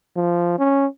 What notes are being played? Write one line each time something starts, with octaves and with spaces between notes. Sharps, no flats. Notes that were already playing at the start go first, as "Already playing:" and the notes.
F3
C#4